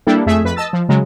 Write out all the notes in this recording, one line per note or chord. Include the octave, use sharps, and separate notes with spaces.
G3 A#3 D4 E4 G4 A4
F2 A3 G#4 E5
F2 B4 B6
D#5 A5 E6 A6
F3
C#3 F#3 G#3